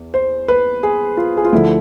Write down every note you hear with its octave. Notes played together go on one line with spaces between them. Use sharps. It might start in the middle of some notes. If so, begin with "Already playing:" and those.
Already playing: E2
C5
B4
G#4
F4
G#4
F4
D2 D3 F3 E4